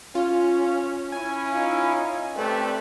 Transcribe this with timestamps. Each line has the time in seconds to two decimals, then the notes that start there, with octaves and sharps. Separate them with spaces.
0.15 C#4 F4
1.12 C#4 E4 G#5
1.53 D#4 F4
2.35 A3 C4 G4 B4 D5